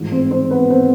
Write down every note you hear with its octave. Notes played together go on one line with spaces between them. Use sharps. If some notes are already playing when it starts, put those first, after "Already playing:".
Already playing: A1 G#2 F3
C4 C5
C4 C5
B3 B4
C4 C5